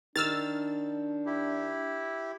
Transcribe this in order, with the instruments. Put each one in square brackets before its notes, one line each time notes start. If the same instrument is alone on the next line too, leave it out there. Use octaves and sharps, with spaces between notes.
[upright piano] D#3 [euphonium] D4 [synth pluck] E6 F6 A6
[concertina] E4 G4